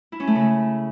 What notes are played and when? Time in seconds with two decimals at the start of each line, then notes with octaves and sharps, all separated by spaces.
0.12 E4
0.20 C#4
0.27 A3
0.35 C#3